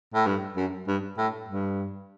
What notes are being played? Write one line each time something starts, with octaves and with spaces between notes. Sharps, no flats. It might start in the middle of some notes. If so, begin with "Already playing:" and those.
A2
G2
F#2
G2
A2
G2